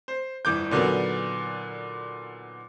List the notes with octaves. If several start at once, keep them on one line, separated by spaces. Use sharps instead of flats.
C5
G1 E3 D6 G6
A#2 D3 D#3 F#3 B3